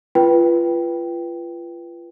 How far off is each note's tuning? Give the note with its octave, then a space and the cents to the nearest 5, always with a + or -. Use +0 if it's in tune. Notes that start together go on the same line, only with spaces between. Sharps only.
F4 -30 B4 -10 G5 -5